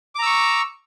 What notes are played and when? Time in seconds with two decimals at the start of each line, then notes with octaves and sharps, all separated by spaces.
0.15 D6
0.19 A#5
0.22 E6
0.26 C#6